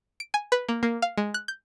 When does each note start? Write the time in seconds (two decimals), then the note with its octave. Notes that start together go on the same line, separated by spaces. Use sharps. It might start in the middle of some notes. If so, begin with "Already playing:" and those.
0.20 D7
0.34 G#5
0.52 B4
0.69 A#3
0.83 A#3
1.02 F5
1.17 G#3
1.34 F#6
1.48 G6